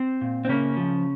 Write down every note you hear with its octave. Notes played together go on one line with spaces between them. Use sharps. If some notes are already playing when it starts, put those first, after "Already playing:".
Already playing: C4
A#2
C4
C#3 A#3 C#4
F3